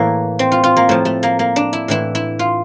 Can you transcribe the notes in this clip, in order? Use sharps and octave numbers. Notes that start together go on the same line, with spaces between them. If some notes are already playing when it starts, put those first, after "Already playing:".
Already playing: A2 E3 A#3
C4
F4
F4
A#3
A2 F3 A3
A3
A#3
A#3
D4
E4
A2 E3 E4
E4
F4